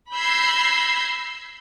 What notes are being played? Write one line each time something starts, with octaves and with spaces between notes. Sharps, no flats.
B5 E6 G6 G#6 A#6 C7